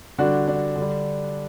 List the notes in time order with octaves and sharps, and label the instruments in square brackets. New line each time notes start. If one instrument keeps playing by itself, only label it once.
[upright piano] D3 G3 D4 F#4
D4
D3
G3